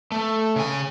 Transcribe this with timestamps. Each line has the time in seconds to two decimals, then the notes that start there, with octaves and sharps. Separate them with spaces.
0.12 A3
0.56 C#3 G#5